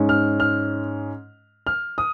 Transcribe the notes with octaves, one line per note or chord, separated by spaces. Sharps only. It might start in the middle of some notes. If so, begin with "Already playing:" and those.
Already playing: G#2 G#3 C#4
F6
F6
F6
D#6